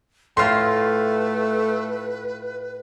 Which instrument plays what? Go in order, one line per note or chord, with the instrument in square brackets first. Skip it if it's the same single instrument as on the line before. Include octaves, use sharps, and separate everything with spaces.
[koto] A2 F4 [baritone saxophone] A3 [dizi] B4 [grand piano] C6